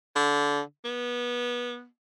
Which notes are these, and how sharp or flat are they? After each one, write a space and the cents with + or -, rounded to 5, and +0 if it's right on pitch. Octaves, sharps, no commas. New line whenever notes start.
D3 -25
B3 -25